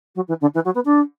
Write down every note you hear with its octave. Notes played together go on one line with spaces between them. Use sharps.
F#3
E3
D3
E3
F#3
B3
D4